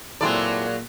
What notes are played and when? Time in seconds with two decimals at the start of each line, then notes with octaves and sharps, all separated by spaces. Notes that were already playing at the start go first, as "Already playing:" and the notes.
0.21 A#2 F#3 G#3 C4 E4 A4 D5